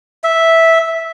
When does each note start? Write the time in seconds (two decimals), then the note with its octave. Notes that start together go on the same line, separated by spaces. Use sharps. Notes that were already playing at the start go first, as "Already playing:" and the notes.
0.24 E5